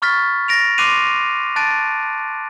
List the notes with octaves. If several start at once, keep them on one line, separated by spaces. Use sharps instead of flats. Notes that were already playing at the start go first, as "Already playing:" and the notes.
B5 C#6 F6 A6 B6
A6 A#6 D7 F7
C6 D6 F#6 C7 D#7 F7
A5 F#6 A6 D7 D#7